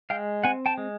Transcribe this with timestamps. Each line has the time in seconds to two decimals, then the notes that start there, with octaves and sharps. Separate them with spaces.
0.10 G#3 F5 G5
0.44 C4 F#5 G#5
0.66 G5 A5
0.78 G#3